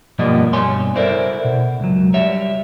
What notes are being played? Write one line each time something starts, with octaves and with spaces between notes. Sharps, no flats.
G2 B2 F3 G3 A#3 D#5
G2 B2 C#5 G#5 C6
E4 A4 A#4 C5 D5
B2
C#2 F#3
G3 C#5 E5